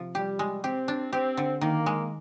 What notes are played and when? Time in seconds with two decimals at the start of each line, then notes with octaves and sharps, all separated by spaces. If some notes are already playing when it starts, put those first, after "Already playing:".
Already playing: C3 F3
0.15 G3 G4
0.39 G#3
0.64 C4 G4
0.88 D4
1.13 C4 G4
1.37 D3
1.61 D#3 A#3
1.86 G#3